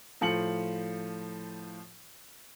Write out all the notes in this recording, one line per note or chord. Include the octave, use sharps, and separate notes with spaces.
A2 F3 C#7 F#7